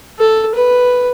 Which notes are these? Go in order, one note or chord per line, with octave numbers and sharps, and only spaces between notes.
A4
B4